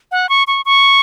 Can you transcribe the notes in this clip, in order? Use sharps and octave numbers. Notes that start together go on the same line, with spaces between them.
F#5
C#6
C#6
C#6